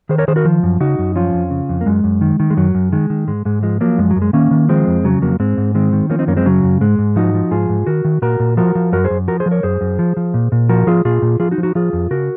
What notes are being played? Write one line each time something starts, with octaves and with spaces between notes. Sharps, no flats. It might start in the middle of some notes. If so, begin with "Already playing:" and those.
D#3 G#4 C5
A#4 C#5
D#3 G#4 C5
F#4 A#4
F3
F#2
C#3 D#4 F#4
F#2
F3 C#4 F4
F2
C#3
F2
A#3
F#2 G#3
F#2
D#3
D#3
G#3
F#2 F#3
F#2
D#3 G#3
D#3
G#2 G#3
G#2 G#3
F3 G#3
F3 F#3 A#3
F#2 G#3
F#3
F#2
G#3
D#3 A#3 C#4
D#3
F3 G#3 C4
F2
C#3 F#3
F2 F#3 A#3
G#2 G#3 C4
G#2
D#3 G#3 C4
D#3
F3 A#3 C#4
C4 D#4
F#2 A#3 C#4
G#3 C4
C#3 F#3
F#2
G#2 G#3
G#2
F3 D#4 F#4
F3
G#2 F4 G#4
G#2
D#3 F#4 A#4
D#3
A#2 F#4 A#4
A#2
F3 F#4 A#4
F3
F#2 F#4 A#4
G#4 C5
F#2
F3 F#4 A#4
G#4 C5
F3
A#4 C#5
F#2 G#4 C5
F#2
F3
F3
A#2
A#2
F3 F#4 A#4
F3 F4 G#4
A#2 F4 G#4
A#2
F3 F4 G#4
D#4 F#4
F3
D#4 F#4
F3 F4 G#4
F2
C#3 F#4 A#4